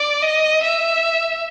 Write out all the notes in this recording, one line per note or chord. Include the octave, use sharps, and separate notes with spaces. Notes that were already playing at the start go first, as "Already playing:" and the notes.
Already playing: D5
D#5
E5